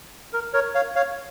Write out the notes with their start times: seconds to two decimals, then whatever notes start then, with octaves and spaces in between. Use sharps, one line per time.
0.33 A#4
0.53 A#4 C#5
0.75 C#5 F5
0.96 C#5 F5